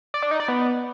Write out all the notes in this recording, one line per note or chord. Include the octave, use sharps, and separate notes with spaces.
D5
D4
D#4
D5
B3